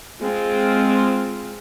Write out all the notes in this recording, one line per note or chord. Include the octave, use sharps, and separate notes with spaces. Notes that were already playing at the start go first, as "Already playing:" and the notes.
G#3 C4 F4